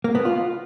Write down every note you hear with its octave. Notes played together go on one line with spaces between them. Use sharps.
A#3
B3
F4